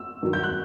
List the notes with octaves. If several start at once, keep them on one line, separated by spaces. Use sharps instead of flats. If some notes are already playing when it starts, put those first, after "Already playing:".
Already playing: E6
G2 D#3 F#3
G6
F#6